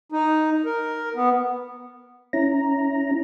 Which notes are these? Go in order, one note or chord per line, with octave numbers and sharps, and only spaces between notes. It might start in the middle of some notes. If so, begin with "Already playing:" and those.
D#4
A#4
B3
C#4 E4 A#5